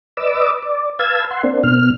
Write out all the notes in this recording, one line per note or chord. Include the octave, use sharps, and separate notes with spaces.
B4 D5 D#5 D6 E6
D5
B4 F5 A5 E6 G#6
F#5 C6
A#3 C4 D4
B2 F6